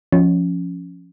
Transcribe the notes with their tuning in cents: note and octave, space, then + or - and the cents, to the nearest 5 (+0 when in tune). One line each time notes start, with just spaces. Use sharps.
F3 +0 C#4 +0